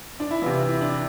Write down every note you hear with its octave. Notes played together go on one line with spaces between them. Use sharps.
D4
E4
C3 E3 F4
E4
D4